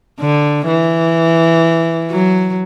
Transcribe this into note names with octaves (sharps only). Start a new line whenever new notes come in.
D3
E3
F#3